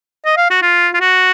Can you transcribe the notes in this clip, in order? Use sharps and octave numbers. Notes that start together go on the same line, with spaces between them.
D#5
F5
F#4
F4
F4
F#4